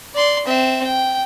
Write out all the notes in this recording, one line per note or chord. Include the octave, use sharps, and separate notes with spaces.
D5 C6
C4 E5
G5